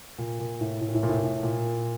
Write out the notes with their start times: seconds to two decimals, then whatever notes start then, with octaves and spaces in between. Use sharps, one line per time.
0.18 A#2
0.39 A#2
0.61 A2
0.81 A2
0.88 A#2
0.95 A2
1.03 A#2
1.09 A2
1.17 A#2
1.23 A2
1.43 A#2